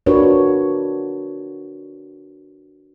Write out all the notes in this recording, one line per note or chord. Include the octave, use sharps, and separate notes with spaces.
D4 F4 F#4 A#4 B4 C#5